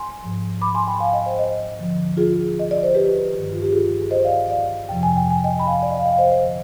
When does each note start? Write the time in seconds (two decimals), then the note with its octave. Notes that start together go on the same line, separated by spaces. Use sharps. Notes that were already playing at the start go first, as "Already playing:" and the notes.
Already playing: G#5 C6
0.23 G#2 F3
0.62 B5 D6
0.74 G#5 C6
0.87 G5 B5
1.00 F5 G#5
1.13 D#5 G5
1.26 C5 D#5
1.39 C5 D#5
1.79 D#2 D3 F3
2.17 F4 G#4
2.59 D#5
2.71 D5
2.83 C5
2.94 G4 B4
3.33 G2 D#3
3.52 F4
3.62 G4
3.72 F4 G#4
4.11 C5 D#5
4.24 D5 F5
4.50 D5 F5
4.89 F2 C3 F3 G5
5.03 G#5
5.17 G5
5.31 G#5
5.44 D#5 G5
5.59 B5
5.67 F5 G#5
5.83 D5
5.90 D#5
5.97 F5
6.05 D#5 G5
6.12 F5
6.18 C5 D#5
6.31 C5 D#5
6.44 D3 F3